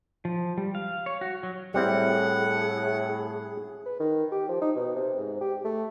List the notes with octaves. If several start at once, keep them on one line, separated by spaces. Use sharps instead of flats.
F3
G3
F5
C#5
F#4
F#3
A2 G3 C4 E4 G#4 F#5
B4
D#3
G4
F3
D#4
B2
C3
G#2
G4
A3